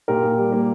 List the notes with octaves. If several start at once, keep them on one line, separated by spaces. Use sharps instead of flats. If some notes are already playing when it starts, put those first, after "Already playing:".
A#2 G4 A#4
A#2
G3
A#3